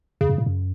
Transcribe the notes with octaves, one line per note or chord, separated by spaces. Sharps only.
E2 C#3
F#2
A2
F#2